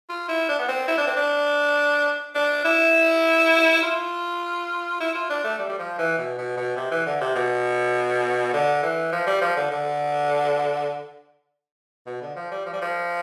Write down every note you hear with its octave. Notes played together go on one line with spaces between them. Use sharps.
F4
E4
D4
B3
C4
E4
D4
C4
D4
D4
E4
F4
E4
F4
D4
A3
G3
G3
F3
E3
B2
B2
B2
C3
E3
D3
C3
B2
D3
E3
F3
G3
F3
D3
D3
B2
D3
F3
G3
F3
G3
F3